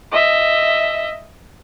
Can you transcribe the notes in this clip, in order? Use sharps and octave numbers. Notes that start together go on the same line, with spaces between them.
D#5 E5